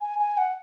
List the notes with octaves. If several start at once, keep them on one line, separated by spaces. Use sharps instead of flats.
G#5
G#5
F#5